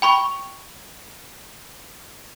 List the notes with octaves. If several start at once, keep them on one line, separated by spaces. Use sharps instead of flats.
G5 B5 C#6